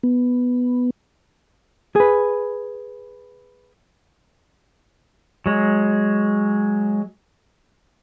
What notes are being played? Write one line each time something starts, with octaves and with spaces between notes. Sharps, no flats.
B3
G#4 B4
F#3 G#3